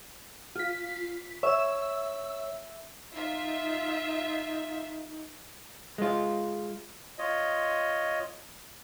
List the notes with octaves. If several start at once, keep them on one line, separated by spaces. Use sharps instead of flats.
F4 B6
C#5 E5 E6
D#4 F4 E5
G#3 F4
F4 C#5 D#5